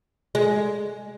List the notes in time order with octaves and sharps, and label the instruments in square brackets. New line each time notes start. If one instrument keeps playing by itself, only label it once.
[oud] G#3